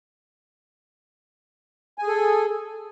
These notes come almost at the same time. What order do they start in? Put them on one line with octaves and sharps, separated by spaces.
G#5 G#4 A4